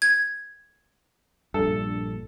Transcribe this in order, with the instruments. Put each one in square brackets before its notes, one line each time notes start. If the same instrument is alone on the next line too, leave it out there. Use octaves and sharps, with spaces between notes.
[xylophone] G#6
[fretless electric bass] A#1 G2 [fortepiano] A4